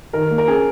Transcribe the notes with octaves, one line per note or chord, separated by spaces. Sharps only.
D#3 A#4
A#3
A#4
C#4 G#4